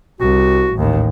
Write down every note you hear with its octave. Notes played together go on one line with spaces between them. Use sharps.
C2 F#4
A1 D#2